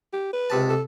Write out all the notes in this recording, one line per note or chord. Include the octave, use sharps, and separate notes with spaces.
G4
B4
C#2 C3 A5
A4